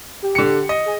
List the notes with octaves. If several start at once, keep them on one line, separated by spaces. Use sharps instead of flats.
G4
D3 C#7
D#5
G#4